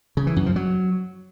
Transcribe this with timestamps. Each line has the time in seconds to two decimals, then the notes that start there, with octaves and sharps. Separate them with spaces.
0.17 C#3
0.27 E3
0.36 F#2
0.46 F3
0.56 F#3